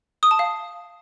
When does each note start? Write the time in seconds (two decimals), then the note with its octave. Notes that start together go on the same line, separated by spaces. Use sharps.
0.23 D#6
0.31 A5
0.39 F5